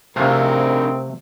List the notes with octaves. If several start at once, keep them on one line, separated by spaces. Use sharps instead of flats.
C3 A3 C4 D4 D#4 G#4 A#4 F5